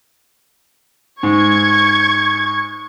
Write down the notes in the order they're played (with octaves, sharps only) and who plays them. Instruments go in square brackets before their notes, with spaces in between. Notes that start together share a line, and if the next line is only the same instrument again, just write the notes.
[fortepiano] G#2 [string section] C#6 G#6